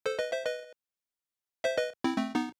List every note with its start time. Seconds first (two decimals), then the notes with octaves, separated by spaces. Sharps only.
0.06 A4 C5
0.19 B4 D#5
0.32 C5 E5
0.45 B4 D#5
1.64 C5 E5
1.77 B4 D#5
2.04 C4 E4
2.17 A3 C4
2.35 B3 D#4